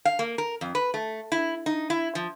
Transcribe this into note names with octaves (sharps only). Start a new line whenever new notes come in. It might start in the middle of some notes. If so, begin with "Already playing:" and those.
F5
A#3
A#4
F2
B4
A3
E4
D#4
E4
F3